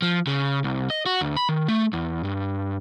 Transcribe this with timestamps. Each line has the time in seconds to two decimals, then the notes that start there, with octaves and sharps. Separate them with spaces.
0.02 F3
0.27 C#3
0.64 C2
0.90 D#5
1.06 F#4
1.21 D2
1.37 B5
1.49 D#3
1.68 A3
1.93 E2
2.24 G2